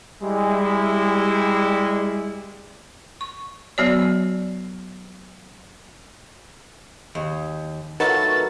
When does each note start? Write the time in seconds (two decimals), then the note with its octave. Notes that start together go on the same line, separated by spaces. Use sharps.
0.23 G3 G#3 E4
3.21 C#6
3.78 F#3 B3 F#4 C#5 D5
7.15 D#2
8.00 F#3 A3 D#4 F4 F#4 A#4 B4 A6